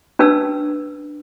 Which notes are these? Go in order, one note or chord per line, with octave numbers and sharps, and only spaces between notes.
C#4 D4 B4 A5 E6